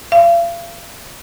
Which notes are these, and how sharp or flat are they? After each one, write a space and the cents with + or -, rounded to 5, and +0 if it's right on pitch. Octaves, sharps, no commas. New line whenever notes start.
F5 -40